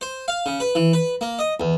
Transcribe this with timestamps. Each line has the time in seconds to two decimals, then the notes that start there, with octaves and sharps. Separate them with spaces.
0.01 C5
0.28 F5
0.46 C#3
0.60 B4
0.75 E3
0.93 B4
1.21 A#3
1.39 D#5
1.60 E2